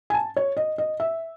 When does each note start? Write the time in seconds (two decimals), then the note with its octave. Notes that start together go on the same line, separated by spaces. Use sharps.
0.10 G#5
0.14 A5
0.36 C#5
0.57 D#5
0.78 D#5
1.00 E5